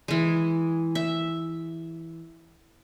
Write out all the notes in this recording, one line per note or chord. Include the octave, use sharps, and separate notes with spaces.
E3 G#3
E5